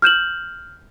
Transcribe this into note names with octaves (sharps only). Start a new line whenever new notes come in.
F6 G6 E7 F#7